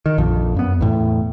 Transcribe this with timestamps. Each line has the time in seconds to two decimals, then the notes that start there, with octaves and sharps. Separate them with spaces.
0.06 D#3
0.18 A#1 F2
0.56 F#2 B3
0.81 E2 A2